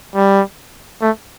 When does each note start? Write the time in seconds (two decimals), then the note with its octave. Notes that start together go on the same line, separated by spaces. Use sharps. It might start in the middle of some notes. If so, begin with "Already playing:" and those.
0.16 G3
1.02 A3